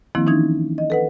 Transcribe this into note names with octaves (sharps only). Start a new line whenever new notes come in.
D#3 F3 A#3 C4 E4
E3 C#4 D#4 G#6
D#5
A4 B4 F#5